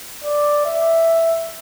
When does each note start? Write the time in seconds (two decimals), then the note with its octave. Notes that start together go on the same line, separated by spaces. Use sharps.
0.24 D5
0.65 E5